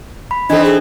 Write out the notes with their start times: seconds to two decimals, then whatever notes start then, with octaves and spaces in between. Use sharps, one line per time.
0.31 B5
0.50 E3 C4 D4 D#4 A4 D#5
0.64 G#4